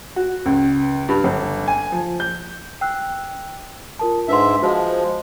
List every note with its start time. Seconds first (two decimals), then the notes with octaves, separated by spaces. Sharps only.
0.16 F#4
0.46 C#2
1.09 G2
1.24 G1
1.68 G#5
1.92 F3
2.20 G6
2.81 G5 E6 F#6
3.99 F4 A#4 A5
4.28 G#2 D4 B4 E5 C6
4.62 F3 G#3 F#4 C5 A5